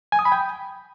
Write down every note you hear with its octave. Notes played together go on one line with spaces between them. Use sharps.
G#5
D#6
B5
G5